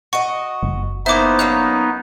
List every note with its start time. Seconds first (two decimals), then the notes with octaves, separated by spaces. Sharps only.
0.13 F#4 D#5 C#6
0.63 F#1
1.06 A#3 B3 D#4 E4 C5 E5 D6
1.39 F#3 A#3 C#4 F#6